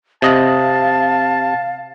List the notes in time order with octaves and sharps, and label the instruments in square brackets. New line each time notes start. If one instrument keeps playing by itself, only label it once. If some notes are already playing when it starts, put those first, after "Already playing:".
[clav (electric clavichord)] C3 D#5 [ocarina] F5 [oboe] A5